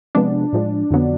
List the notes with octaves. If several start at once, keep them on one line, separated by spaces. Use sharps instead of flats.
C3 F3 G#3 B3 D4
A2 F3 G#3
F2 D3 F#3 B3